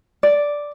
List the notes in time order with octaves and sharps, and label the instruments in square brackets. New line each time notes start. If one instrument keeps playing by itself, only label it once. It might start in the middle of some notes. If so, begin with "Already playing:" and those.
[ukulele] D5